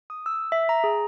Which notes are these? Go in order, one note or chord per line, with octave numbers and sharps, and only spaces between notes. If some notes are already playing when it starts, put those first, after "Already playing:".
D#6
E6
E5
A#5
G#4